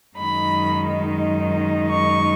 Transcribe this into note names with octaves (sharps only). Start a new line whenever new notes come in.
F#2 D#3 G#3 D#4 B5
C#6